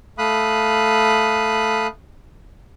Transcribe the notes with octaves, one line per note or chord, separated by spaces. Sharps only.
A3 F5 B5 D#6 F#6